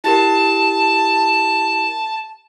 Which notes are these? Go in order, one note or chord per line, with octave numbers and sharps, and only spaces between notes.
E4 G4 A#4 A5